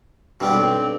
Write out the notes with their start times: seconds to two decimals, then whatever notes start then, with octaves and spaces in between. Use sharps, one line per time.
0.41 G2 B2 G3 B3 C4
0.53 B1